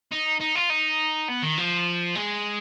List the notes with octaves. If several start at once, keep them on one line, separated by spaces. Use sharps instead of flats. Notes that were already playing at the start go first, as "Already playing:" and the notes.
D#4
D#4
F4
D#4
B3
D#3
F3
G#3